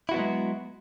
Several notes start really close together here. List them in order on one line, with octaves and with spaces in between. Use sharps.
E4 F#4 B3 F#3 G#3